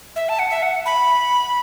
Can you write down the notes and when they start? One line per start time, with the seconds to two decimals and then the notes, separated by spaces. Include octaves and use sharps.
0.16 E5
0.29 A5
0.39 F#5
0.50 E5
0.63 F#5
0.86 B5